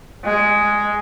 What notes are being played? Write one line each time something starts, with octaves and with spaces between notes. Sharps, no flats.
G#3